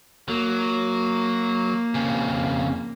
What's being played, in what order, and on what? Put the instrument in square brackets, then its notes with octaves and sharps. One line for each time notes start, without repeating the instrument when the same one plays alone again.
[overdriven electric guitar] F#3 [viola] A#3
[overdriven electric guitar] F2 C#3